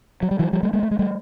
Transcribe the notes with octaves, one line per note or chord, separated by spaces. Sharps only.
F#3
G3
E3 F#3
F3 G3
G3 A3
G#3 A#3
A3
G#3
G3 A3